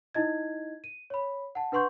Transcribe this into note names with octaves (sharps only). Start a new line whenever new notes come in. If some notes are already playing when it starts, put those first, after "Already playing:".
D#4 E4 D#5 G#6
D#7
C#5 B5
F#5 A5
D4 B4 F#5 C6 C#6 G6